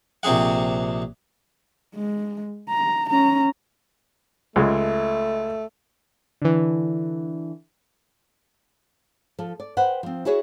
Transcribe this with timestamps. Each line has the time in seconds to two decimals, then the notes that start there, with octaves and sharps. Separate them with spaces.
0.23 A#1 C3 C4 G#4 F#5
1.95 G#3
2.70 A#5
3.09 C#4 A#5
4.56 C#2 G#3 A3
6.42 D3 E3
9.39 F3 A4
9.60 D5
9.77 B4 C5 F#5 G5
10.03 F3 C4
10.25 E4 F#4 G#4 C#5 E5